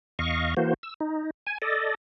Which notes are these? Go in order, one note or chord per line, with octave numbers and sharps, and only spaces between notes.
E2 D#5 F5 C#6
E3 A#3 F#4 C5
E6
D#4
G#5
A4 D5 D#5